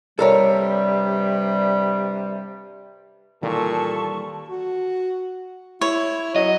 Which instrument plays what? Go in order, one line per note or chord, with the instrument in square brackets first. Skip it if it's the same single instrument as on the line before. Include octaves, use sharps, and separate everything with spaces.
[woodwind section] G2 C3 G3 [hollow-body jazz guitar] A4 A#4 C#5
[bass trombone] A#2 [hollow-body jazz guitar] D#3 E3 G3 [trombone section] A4 [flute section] A5 C#6
[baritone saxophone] F#4
[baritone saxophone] E4 [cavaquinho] C#5
[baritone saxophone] F#3 [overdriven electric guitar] D#5